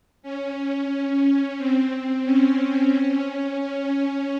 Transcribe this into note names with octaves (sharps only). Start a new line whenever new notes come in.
C#4
C4
C4
C#4
C#4